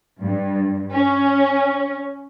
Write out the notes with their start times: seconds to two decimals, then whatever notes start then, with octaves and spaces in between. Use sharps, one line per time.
0.22 G2
0.93 C#4